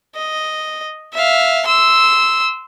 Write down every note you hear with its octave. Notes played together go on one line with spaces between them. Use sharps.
D#5
E5 F5
C6 E6